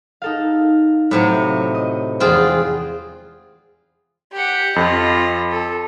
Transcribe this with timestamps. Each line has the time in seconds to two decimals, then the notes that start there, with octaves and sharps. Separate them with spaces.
0.22 D#4 A4 F5
1.11 A2 C3 F#3
1.74 D#5
2.20 E2 G#3 C4 F4 G#4
4.32 G4 F#5
4.76 F2 F4 D#5
5.52 A4